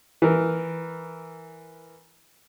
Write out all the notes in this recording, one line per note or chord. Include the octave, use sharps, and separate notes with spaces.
E3 A#4